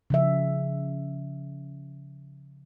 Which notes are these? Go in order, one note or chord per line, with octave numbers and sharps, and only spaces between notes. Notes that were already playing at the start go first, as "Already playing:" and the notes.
C#3 F3 E5